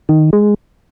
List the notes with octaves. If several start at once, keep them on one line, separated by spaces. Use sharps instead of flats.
D#3
G#3